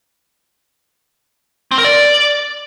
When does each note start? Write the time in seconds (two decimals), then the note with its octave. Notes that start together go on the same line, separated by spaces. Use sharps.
1.71 C4
1.78 A#4
1.84 D5